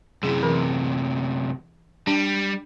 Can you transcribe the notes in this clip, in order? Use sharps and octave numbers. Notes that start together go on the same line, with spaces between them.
F#2 C3 E4 G#4
E3 A#4
G3 D4